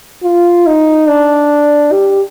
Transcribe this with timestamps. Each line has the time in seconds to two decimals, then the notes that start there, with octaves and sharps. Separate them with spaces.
0.23 F4
0.66 D#4
1.08 D4
1.92 G4